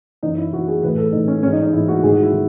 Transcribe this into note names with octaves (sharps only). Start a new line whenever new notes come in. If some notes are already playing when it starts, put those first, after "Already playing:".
F#2 E3 D#4
E4
F#2 E3 F#4
G#4
A2 E3 B4
A4
A2 E3 D#4
C#4
G#2 E3 C#4
D#4
D#4
G#2 E3 E4
F#4
G#2 D#3 G#4
F#4
E4
D#3